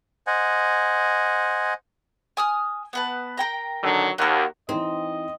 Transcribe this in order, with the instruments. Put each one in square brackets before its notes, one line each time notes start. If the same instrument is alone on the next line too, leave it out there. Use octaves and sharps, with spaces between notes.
[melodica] C5 D#5 F#5 G#5
[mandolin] G#5 D#6 F6
B3 B4 A5
A#4 G5 A#5
[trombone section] D3 D#3 F#3
[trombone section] D#2 [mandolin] F#4 A#4
[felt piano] E3 D#4 [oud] C4 [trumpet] D#5